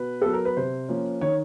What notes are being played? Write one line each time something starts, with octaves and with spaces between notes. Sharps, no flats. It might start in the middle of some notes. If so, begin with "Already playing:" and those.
Already playing: B2 B4
F#3 B3 A4
A#4
B4
C3 C5
F3 A#3 C#4
D#3 C#5